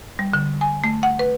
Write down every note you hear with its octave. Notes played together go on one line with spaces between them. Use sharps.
G3
D3
G#5
A3
F#5
B4